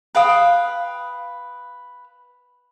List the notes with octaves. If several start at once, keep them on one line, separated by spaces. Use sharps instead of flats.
B4 F5 G5 D#6